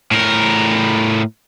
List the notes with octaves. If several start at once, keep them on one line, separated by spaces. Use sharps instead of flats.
A2 A#4